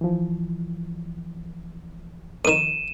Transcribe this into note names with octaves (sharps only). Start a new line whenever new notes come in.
E3 F3
F2 D#3 D#7 E7